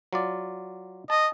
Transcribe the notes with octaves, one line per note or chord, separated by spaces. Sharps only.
F#3 F4 D5
D#5 A5